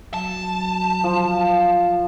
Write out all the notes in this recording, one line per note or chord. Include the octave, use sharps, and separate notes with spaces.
F#3 A5
F3